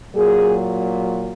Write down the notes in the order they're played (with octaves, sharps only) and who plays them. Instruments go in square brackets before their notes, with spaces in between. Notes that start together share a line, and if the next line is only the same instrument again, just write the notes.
[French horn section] A#2 F#3 G#4